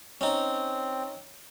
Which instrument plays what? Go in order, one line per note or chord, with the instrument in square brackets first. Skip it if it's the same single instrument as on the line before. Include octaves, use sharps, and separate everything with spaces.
[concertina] C4 [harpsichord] C#4 D#4